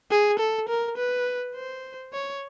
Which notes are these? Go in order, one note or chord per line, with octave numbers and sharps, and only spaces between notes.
G#4
A4
A#4
B4
C5
C#5